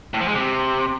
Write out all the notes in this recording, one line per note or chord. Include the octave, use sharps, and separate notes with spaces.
A2
F3
G#3
C3